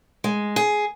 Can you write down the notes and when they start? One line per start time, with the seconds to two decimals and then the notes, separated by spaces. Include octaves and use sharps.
0.24 G#3
0.56 G#4